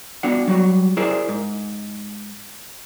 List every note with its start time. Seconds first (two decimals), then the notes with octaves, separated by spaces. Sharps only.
0.23 B3 D4 F#4 F#5
0.47 F#3 G3 F#4
0.97 E4 G#4 A#4 C5 D5
1.29 G#2